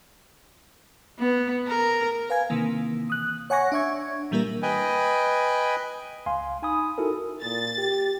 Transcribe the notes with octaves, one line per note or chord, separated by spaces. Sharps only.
B3
A#4
B4 F5 G#5 G#6
C3 D#3 E3 A#3
D#6 F#6
C#5 F#5 G#5 C#6 A#6
D4 E5 C#6 G#6
A#2 E3 G3 A#3 E4 A#4
B4 D#5 G5 G#5
C#2 F5 G#5 C6
D#4 G#5 B5 D#6
D#4 E4 F#4 A4 A#4 G#5
A#2 A6
G4